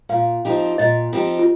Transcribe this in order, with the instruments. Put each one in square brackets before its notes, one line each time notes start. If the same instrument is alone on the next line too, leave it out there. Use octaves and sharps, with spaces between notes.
[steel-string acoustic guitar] A#2 [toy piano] F5
[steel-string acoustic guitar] F3 C4 D#4 G4
[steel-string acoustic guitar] A#2 [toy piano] D#5
[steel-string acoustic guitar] F3 C4 D#4 G4
[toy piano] F4